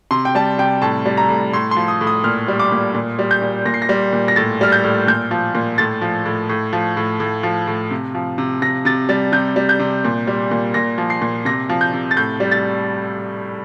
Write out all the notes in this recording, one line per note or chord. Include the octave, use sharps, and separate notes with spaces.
C3 C6
G5
G3 A5
C3 G5
A2 A5
G3
A#5
A2
A2 C6
C6
F3
D#6
A2
D#6
A#2 F6
G3
D6
A#2
A#2
G3
G6
A#2
A#2 A#6
C7
A#6
G3
A#2
A#6
A2 A6
G3 F6
G6
A2
A#2 G6
F3
A#2
A2 A6
F3
A2
A2
F3
A2
A2
F3
A2
C3
F3
C3
C3 A#6
C3 A6
G3 A6
C3 G6
G3
G6
C3
A#2
G3
A#2
A#2 A#6
F3
C7
A#2
C3 A#6
F3
G6
C3
A6
A2 G6
G3
A6